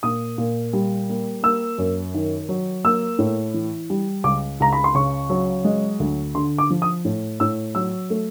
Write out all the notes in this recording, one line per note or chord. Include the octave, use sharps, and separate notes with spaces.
A#2 D#6
A#2
G3
A#3
A#3 E6
F#2
D#3
F#3
A#3 E6
A2
E3
G3
C#2 D6
C#2 A#5
B5
C6
C#3 C#6
F#3
G#3
D2
D3 C6
D6
F3
D#6
A2
A2 E6
F#3 E6
A3